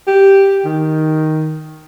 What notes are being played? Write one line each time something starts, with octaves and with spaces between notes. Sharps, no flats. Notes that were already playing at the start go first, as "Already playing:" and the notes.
G4
D#3